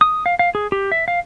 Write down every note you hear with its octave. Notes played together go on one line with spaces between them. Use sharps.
D#6
F5
F5
G#4
G4
E5
F5